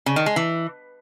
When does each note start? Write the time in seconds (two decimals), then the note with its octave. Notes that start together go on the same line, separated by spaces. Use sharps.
0.06 C#3
0.16 D#3
0.26 G#3
0.36 E3